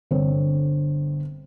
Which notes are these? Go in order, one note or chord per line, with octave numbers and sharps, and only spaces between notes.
G1 D3 C4 C#5